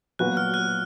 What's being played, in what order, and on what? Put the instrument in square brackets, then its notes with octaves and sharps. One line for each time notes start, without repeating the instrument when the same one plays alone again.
[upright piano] A#2 F#3 B3 F#4 B4 [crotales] F#6
[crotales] F6
F#6